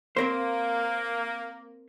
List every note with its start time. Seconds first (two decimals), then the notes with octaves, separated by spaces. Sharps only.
0.17 A#3 C4 A#4 C5